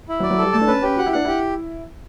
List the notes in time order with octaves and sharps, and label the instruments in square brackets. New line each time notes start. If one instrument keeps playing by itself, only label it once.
[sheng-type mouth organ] E4
[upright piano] F#3
[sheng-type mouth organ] D5
[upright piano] F#3
[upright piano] G3 [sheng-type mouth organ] A4
[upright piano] A3 [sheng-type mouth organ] A5
[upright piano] D4
[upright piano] C#4 [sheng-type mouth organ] B4
[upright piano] C#4 [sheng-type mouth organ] G4
[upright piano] F#4 [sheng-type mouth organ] F#5
[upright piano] E4
[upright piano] D4 [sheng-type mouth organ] F#5
[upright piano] E4 [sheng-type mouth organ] G4